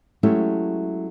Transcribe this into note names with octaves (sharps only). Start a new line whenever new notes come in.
F#3 G#3 A3 C#4 E4 G4